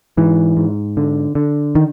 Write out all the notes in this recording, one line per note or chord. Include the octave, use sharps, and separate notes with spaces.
G#2 E3
G#2
D3
D3
D#3